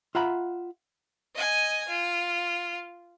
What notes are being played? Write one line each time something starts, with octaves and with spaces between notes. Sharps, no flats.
F4 E5 F#5 A#5 B5
D#5 G#5
F4